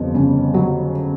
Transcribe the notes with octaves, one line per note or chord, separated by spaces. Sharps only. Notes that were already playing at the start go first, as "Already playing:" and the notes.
Already playing: G1 F2
C#3
F#3